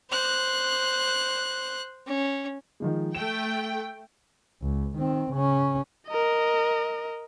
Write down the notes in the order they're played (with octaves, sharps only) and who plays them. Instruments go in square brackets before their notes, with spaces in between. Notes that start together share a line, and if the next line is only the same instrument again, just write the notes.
[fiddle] C5 F#6
C#4
[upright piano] D#3 F3 G#3
[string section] A3 G5 [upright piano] E7
[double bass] C#2
D#3 C4
C#3 C#4
[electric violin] A#4 D#5